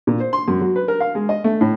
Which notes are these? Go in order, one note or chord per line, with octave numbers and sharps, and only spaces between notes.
A#2
C5
C6
F#2
F#3
B4
A#4
F5
G#3
D#5
A3
A2